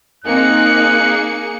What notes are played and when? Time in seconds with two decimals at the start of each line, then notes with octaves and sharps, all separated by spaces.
0.24 A#3 C4 D#4 G#4 F#6 C#7